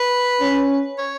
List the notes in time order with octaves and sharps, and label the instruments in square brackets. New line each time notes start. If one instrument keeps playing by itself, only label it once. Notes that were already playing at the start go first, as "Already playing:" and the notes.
Already playing: [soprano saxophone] B4
[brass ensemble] C#4
[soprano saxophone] C#5